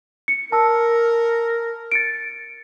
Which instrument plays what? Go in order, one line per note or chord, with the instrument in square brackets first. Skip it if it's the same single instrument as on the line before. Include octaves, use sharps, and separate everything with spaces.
[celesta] C#7
[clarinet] A#4 [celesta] A5 E6
[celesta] A6 C#7 D7